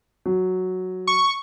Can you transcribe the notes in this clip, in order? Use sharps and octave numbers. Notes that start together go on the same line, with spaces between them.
F#3
C#6